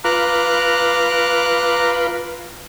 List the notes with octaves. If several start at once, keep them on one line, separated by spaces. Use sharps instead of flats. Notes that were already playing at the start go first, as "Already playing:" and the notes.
F4 B4 A#5 D6 F#6